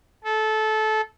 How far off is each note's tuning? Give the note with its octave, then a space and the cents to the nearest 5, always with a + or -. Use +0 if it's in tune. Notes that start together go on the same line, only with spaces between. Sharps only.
A4 -20